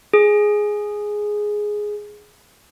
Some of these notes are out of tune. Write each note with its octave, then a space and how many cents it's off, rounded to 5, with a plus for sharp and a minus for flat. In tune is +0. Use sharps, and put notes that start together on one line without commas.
G#4 +5